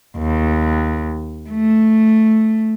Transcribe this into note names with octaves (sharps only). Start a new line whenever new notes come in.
D#2
A3